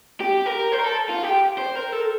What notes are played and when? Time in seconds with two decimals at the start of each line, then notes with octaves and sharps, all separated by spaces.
0.21 G4
0.46 A#4
0.72 C5
0.79 A#4
0.85 A4
1.10 F4
1.24 G4
1.58 C5
1.75 A#4
1.93 A4